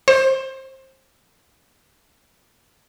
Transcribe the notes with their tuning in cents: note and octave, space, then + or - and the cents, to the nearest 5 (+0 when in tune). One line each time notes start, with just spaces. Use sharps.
C5 +20